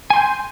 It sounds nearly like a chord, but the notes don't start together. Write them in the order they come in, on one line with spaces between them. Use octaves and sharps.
G#5 C6 G6